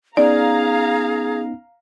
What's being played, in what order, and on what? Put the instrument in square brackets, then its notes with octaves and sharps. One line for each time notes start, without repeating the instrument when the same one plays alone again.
[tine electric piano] B3 C#4 D#4 [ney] G#4 [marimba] D5 [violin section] F5 A#5